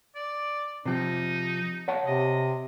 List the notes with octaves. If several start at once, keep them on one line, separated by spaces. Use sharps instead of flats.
D5
C3 F3 D#4
C#5 F#5 A5
C3 D#5